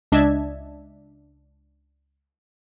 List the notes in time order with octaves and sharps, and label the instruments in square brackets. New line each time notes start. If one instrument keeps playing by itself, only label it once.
[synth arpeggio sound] C#2 D4 D#5 E5 A5 G#6